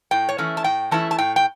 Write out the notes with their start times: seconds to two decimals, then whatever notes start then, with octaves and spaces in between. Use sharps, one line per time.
0.11 A2 G5
0.29 C#5
0.38 E3 A3 C#4 E4
0.57 A5
0.64 A2 G5
0.91 E3 A3 C#4 E4 A5
1.11 A5
1.18 A2 G5
1.36 G5